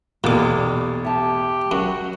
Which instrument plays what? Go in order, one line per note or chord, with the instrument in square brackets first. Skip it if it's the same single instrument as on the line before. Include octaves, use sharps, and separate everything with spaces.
[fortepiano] B1 E2 [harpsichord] A#2 D6 [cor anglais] G3 [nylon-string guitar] G4
[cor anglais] G4 [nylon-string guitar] E5 A5
[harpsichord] F#2 [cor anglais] F#4